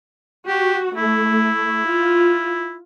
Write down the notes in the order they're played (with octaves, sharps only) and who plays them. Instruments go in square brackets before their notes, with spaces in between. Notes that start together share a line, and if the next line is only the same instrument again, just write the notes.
[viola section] F#4 [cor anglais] G4
[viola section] A3 [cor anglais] E4
[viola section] F4